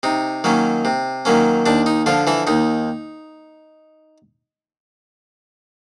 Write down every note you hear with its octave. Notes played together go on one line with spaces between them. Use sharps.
C3 D#4
D#3 F#3 A#3 C#4
C3
D#3 F#3 A#3 C#4
D#2 D4
D#4
D3 F3 F4
E3 E4
D#2 D#4